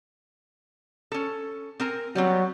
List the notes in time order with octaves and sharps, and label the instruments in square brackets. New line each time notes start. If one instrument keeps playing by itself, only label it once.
[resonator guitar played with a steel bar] C#4 A4
C4 A#4 G#5
[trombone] F#3 [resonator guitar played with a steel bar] G3 B3 C4